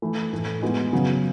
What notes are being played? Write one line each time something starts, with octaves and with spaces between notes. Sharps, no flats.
E3 A3 E4
A2 E3 A3
E3 G#3 B3 F#4
C#3 F#3 B3